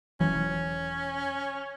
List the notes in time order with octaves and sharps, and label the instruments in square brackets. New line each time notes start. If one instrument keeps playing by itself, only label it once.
[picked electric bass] E1 E3 F#3 [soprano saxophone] C#4